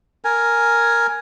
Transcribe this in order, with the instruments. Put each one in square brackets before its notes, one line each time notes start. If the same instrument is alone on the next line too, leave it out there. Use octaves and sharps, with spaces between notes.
[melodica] A#4 G#5